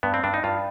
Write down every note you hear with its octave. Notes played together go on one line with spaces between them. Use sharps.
G2 B3
C4
G2 D4
D#4
G2 F4